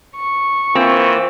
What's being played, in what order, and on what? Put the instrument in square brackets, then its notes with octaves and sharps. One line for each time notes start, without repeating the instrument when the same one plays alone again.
[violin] C#6
[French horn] E3 [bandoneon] A#3 F4 [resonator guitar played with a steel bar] C4